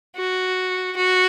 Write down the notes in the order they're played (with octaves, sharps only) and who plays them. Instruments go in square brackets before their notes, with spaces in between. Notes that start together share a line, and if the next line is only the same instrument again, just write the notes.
[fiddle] F#4
F#4